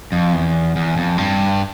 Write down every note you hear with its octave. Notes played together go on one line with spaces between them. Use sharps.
F2
E2
E2
F2
G2